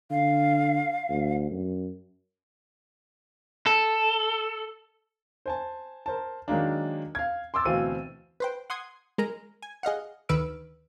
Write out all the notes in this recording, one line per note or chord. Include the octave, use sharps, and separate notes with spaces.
D3 F5
D2
F#2
A4
C5 G#5 A5
A#4 C5 A5
D#3 F#3 G#3 A#3 D4
F5 G#6
C6 D6 E6 A6
D2 B2 E3 C4 F5 D#7
B4 C5 G5
F#5 C6 D#6 G#6
G#3 A#4 A#5
G#5
G#4 D#5 F5 F#5
D2 D#3 B4 E6 F6 D7